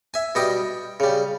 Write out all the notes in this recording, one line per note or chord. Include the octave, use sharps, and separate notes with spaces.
E5 G#5
B2 G3 D#5 G5
C#3 G3